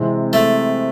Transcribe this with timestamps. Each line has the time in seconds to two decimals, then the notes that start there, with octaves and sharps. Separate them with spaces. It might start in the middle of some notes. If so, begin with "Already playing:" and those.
Already playing: C3 E3 G#3 C4
0.33 A3